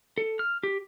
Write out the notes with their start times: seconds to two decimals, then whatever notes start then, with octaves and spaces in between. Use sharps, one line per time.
0.18 A4
0.39 F6
0.63 G4